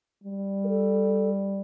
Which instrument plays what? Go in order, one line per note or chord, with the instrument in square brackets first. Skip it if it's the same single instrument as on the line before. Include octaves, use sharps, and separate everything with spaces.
[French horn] G3
[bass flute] A#4
A4